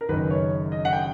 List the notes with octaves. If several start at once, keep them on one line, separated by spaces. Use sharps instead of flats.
A#4
F#1 F#2 D#3 B4
C#5
D#5
F#5
G5